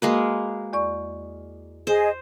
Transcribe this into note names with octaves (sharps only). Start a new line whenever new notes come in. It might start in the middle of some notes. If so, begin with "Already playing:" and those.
G#3 A#3 F#4 B4
E2 D5 C#6
G#4 C5 D#5